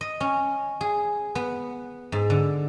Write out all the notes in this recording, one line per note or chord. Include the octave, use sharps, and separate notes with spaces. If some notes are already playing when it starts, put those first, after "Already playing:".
D#5
C#4
G#4
B3
G#2
D3